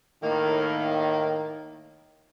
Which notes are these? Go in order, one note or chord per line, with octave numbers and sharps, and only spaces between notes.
A2 D#3 A#3